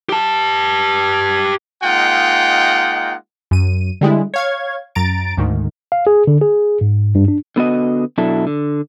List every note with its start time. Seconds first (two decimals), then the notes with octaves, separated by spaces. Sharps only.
0.09 G4 A5
1.83 G#3 A#3 D#4 F4 F#5 G5
3.51 F#2 D#7
4.01 D3 G3 G#3 E4
4.34 C#5 F5 G#6
4.95 F#2 A#5 A6 D7
5.37 D2 G#2 D#3
5.92 F5
6.07 G#4
6.27 D3
6.42 G#4
6.81 G#2
7.15 G2
7.28 D4
7.56 D3 B3 F#4 D#5
8.18 B2 F#3 D4 E4 A4
8.47 D3